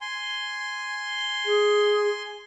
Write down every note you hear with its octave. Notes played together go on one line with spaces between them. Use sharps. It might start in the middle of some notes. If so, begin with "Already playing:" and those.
G#5 C6
G#4